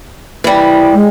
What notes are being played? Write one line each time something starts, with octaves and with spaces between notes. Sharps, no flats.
E3 G3
G#3